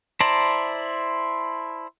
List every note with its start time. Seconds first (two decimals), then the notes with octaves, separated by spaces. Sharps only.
0.21 E4 C5 D5 A5 A#5